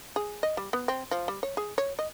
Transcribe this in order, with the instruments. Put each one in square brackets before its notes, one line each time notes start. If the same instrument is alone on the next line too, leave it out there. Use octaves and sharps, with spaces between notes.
[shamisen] G#4
D#5
G3
B3
C4
F3
G3
C#5
G#4
C#5
D#5